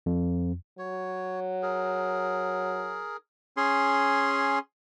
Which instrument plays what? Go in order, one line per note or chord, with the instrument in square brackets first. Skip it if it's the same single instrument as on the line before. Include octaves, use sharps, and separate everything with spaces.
[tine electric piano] F2
[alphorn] F#3 [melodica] C#5
[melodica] G#4 A#4
[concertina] C#4 G#4 C6